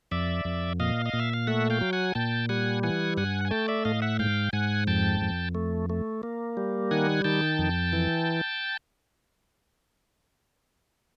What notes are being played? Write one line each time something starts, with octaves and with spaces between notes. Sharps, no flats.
F2 D5 E5
F2
A#2 D#5 F5
D#5
A#2
E5
F5
A3 E5 F#5
F5 G5
F#3
F#5 G#5
A#2 G5 A5
G3 F#5 G#5
E3 F#5 G#5
G2 F#5 G#5
G#5
A3 G5 A5
D5 E5
A2 D#5 F5
E5 F#5
G#2 F5 G5
G#2 F#5 G#5
F2 G5 A5
F2
A3
A3
A#3
G3
D#3 F#5 G#5
D#3 G5 A5
F2
E3